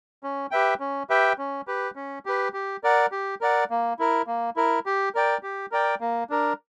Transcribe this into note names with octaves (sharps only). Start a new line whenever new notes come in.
C#4
G4 B4 E5 G5
C#4
G4 B4 E5 G5
C#4
G4 B4
C#4
G4 B4
G4
A#4 D5 F#5
G4
A#4 D5 F#5
A#3
E4 A#4
A#3
E4 A#4
G4
A#4 D5 G5
G4
A#4 D5 G5
A#3
D4 A#4